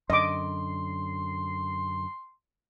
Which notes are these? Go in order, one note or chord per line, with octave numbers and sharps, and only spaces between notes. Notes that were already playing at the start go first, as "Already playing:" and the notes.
F#2 D3 D#5 C6 D6